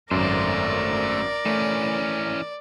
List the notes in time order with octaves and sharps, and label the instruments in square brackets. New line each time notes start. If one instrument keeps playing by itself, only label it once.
[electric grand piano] G#1 F#2 [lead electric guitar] A3 C5 [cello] A#4 [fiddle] D5
[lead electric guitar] E3 C#4 [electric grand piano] A3